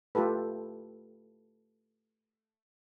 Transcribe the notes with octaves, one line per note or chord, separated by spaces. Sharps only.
A3 F4 G4 A4 B4